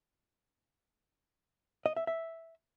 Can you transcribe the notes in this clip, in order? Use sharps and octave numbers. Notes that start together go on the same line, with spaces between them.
D#5
E5
E5